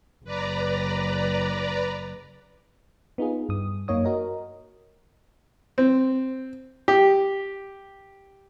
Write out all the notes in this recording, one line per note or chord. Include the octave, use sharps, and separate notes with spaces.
F#1 B4 D5 A#5
B3 D#4 F4 G#4
G2 D#6
F#2 A#3 D#4 C#5 D#6
F#4 A#4 D#5
C4
G4